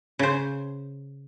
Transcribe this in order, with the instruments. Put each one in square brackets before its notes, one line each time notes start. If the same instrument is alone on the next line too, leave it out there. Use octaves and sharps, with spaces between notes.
[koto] C#3 C5